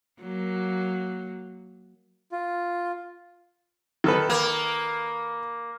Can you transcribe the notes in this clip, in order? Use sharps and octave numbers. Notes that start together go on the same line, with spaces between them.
F#3 A#3
F4
D#3 A4 B4
A#3